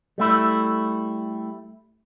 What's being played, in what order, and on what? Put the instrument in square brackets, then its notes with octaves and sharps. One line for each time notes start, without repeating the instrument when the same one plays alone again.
[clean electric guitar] G3 A3 E4